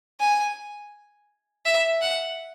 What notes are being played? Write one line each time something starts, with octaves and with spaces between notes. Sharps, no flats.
G#5
E5
F#5